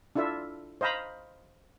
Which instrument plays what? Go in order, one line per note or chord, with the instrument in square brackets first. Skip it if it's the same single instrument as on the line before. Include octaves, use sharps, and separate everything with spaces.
[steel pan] D4 E4 F4 A4 E5
C5 D#5 F5 A#5 B5